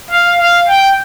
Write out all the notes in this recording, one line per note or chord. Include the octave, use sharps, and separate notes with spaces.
F5
F5
G5